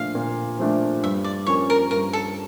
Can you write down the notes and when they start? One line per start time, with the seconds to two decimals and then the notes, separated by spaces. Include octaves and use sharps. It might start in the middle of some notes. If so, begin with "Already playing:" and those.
Already playing: A#2 F3 A3 D4 F5
0.15 A#2
0.59 F3 A3 D4
1.03 G2 E5
1.24 D5
1.46 F3 A#3 C#4 C#5
1.70 A#4
1.91 G2 A#4
2.13 A4